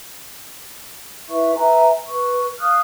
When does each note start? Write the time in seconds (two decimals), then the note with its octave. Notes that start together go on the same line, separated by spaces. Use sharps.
1.29 E4 B4 E5 C#6
1.56 B4 E5 G#5 A#5
2.07 B4 C#6
2.60 F5 D#6 F6 F#6